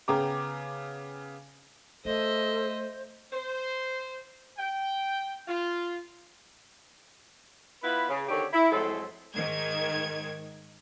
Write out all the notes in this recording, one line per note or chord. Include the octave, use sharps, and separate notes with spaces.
C#3 B3 G#4 G5 A#5 D6
A3 A4 C5 D#5 E5
C5
G5
F4
B3 E4 F4 B4
C#3
D3 D#3 C4 D4 G4 C#5
E4
F2 A2 F#3 G#3 A4 C5
G#2 D#3 G#6